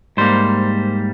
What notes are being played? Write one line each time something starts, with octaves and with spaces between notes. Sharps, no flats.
G#2 G3 A#3 C5